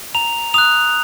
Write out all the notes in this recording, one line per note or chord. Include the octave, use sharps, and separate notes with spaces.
A#5 F7
D#6 F#6 F7